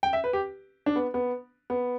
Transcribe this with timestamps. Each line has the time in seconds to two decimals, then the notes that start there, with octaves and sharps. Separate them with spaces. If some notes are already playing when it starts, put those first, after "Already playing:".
0.03 G5
0.13 E5
0.24 B4
0.33 G4
0.86 D4
0.96 B3
1.14 B3
1.70 B3